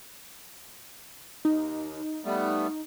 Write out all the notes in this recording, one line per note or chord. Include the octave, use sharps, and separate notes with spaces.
D#2 D#4
G3 A3 B3